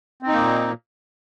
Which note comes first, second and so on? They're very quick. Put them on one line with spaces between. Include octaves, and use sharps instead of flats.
C4 D#4 A#3 A#2